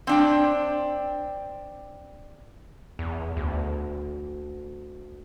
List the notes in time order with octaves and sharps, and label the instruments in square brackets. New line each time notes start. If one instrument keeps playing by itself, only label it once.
[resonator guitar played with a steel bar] C4 D4 G5
[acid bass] E2
D2